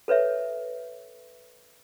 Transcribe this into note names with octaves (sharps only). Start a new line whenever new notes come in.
A4 B4 C#5 E5